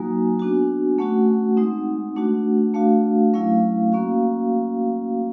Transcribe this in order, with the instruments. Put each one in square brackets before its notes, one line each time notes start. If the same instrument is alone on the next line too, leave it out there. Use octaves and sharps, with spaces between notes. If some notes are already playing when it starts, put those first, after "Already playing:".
Already playing: [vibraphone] F#3 A#3 D#4 F#4 G#5
B3 D4 F#4
A3 C#4 F#4 F#5
G#3 C4 D#4
A3 D4 F#4
A3 D4 F#4 F5
F#3 A3 C#4 E4 F5
A#3 C#4 F#4